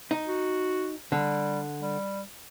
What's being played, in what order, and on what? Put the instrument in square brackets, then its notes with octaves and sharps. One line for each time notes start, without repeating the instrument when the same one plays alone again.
[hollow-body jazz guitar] D#4
[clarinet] F#4
[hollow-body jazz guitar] D3 [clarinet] G3
[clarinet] G3